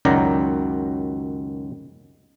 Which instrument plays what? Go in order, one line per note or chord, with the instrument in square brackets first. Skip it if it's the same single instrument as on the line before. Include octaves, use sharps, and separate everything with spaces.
[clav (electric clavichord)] C#2 F#2 D#3 F#3 D5 A#5